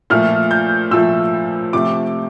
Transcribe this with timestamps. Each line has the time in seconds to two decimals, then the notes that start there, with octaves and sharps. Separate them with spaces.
0.10 A#2 F3 A3 F6
0.51 G6
0.91 A#2 F3 A3 E6
1.73 C3 F3 A3 D6